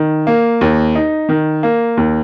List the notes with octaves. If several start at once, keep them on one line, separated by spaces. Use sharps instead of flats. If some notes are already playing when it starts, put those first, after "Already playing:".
Already playing: D#3
A#3
D#2
D#4
D#3
A#3
D#2